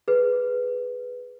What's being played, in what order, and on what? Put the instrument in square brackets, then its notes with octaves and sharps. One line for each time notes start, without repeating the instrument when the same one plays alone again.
[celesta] G#4 B4